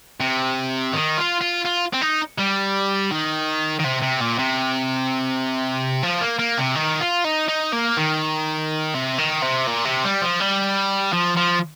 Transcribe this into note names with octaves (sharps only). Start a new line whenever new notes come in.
C3
D#3
F4
F4
F4
C4
D#4
G3
D#3
D#3
C3
C3
A#2
C3
F3
A#3
A#3
C3
D#3
F4
D#4
D#4
A#3
D#3
C3
D#3
C3
A#2
C3
G3
F3
G3
F3
F3